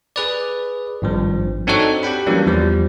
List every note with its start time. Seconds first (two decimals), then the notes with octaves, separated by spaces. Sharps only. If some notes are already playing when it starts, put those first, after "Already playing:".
0.16 G#4 B4 D5
1.02 G#1 G2 F3
1.67 C4 D4 D#4 F#4 A4 C#5
2.03 G4 F#5 G5 B5
2.26 E3 F#3 G3 A#3 C#4 D4
2.46 E2 F3 G3